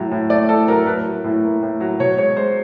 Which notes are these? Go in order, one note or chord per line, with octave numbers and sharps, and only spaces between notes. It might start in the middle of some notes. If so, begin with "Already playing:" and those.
Already playing: A2 F#3
A2
A3 D5
A2 A4
F#3 A#4
A2 B4
F#3
A2
A#3
A2
F#3
B2 C#5
G#3 C#5
G#3 C5